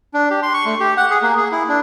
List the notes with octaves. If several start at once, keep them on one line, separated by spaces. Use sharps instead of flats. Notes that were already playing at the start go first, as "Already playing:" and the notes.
D4
G4
C6
C#6
A3
G4
F#5
G#4
A#3
G#4
E4
D4